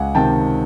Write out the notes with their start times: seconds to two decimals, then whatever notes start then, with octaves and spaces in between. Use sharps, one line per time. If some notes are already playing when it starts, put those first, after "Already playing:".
Already playing: C#2 F#5 G#5
0.15 C3 D#3 G5 A5